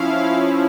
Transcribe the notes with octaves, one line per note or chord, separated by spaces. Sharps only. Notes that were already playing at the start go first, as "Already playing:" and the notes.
Already playing: F3 C#4 E4 F5